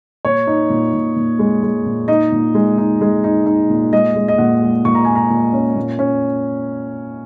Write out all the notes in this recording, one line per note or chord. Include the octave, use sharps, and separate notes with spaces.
A#2 C#5
D#4
A#2
A#2
A#2
G#3
G#3
A#2
D#4 D#5
A#2
G#3
D#4
G#3
D#4
D#4
A#2
G#3 D#5
G#3
D#5
A#2 F#5
G#3
A#2 C#6
A#5
A#2 G#5
A#5
A#2
C#4
A#2
C#4